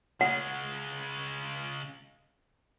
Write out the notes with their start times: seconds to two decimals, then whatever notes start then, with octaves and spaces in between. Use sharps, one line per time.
0.21 C#3 G#3 F#5